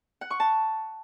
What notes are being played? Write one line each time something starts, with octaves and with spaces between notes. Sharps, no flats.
F#5
C#6
A5